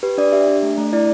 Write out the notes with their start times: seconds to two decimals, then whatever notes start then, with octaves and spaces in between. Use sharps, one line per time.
0.03 G4 B4
0.18 D4 D5
0.32 G4 E5
0.48 D4
0.63 A3
0.78 A3
0.93 E4 D5